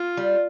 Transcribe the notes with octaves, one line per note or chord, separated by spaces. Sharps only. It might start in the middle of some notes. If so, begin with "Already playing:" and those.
Already playing: F4
G3